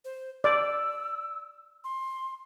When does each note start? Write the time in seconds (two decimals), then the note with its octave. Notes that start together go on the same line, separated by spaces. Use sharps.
0.05 C5
0.44 D5 E6
1.84 C6